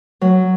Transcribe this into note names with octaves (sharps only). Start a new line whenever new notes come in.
F#3